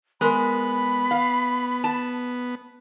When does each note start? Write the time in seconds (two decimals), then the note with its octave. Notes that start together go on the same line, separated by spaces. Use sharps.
0.21 G#3 B3 A#4 B5
1.11 F5
1.84 A5